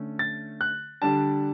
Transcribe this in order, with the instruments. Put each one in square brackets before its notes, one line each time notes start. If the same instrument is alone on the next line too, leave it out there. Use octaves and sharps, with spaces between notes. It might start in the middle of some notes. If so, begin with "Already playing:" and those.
Already playing: [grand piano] D3 A3 C#4
A6
F#6
D3 G3 D4 A5